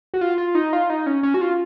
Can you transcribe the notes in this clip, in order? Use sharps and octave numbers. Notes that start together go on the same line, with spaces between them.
F#4
F4
F4
D#4
F4
D#4
C#4
C#4
F#4
F4